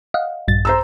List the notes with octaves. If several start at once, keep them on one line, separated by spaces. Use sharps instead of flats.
D#5 F5 F#5
A#1 G2 A6
C5 A#5 E6